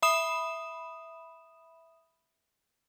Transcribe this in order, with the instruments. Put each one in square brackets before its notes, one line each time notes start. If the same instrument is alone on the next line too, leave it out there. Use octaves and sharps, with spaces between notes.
[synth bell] E5 B5 D#6 E7